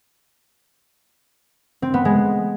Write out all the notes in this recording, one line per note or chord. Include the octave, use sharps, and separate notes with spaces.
C4
B3
G#3